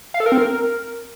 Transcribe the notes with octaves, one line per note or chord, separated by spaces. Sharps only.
F5
A4
A#4
C4
A#4